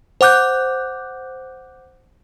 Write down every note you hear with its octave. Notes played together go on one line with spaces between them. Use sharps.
C5 F#5 D6 F#6 G6